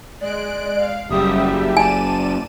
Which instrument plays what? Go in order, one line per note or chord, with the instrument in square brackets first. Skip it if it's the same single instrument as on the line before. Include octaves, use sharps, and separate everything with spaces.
[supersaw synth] G#3 F#6 D7 [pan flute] D5
[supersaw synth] F5
[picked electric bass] F#1 [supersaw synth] G3 G4 E5 [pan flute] D#6
[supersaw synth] D5 D#7 E7 [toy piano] G#5 [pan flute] A5